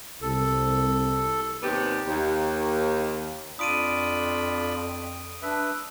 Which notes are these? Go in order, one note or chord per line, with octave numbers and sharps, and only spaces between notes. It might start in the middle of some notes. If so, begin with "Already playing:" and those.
C2 A4
D#2 C3 B3 G4 D5
D#2
F2 D4 F4 B5 D#6 D7 D#7
D4 B4 E5